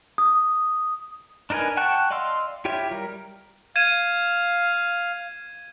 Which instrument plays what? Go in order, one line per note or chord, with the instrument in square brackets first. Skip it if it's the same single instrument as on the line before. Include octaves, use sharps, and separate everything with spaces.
[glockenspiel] D#6
[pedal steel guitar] D4 D#4 A#4 B4 G#5
F#5 G5 A5 C#6 F#6
D5 D#5 F5 C6 E6
E4 F4 G4 C#5 E5
G3 A#4
[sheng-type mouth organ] F5 [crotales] G#6 D#7 E7